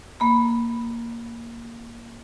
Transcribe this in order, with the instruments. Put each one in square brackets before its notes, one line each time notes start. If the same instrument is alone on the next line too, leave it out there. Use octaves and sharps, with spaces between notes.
[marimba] A#3 B5